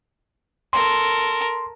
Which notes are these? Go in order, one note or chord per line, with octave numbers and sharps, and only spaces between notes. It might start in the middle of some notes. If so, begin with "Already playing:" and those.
A4 A#4 C6